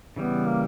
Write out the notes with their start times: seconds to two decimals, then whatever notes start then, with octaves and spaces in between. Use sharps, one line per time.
0.16 C#3 E3 G3 B3
0.47 A#3